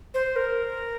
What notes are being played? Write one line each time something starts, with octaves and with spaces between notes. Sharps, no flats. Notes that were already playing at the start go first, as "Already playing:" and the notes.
C5
A#4